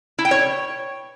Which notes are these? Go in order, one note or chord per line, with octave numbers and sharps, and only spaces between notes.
E4
G5
C#5